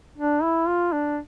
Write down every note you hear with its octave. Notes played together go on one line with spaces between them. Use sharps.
D4
E4
F4
D4